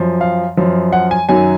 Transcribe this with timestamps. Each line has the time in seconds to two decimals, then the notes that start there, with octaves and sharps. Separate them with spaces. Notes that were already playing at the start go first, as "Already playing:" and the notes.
Already playing: F#2 F3
0.21 F5
0.57 F#2 F3
0.93 F#5
1.11 G#5
1.29 F#2 D#3 F#3 G#5